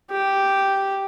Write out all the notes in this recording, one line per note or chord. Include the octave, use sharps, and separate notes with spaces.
G4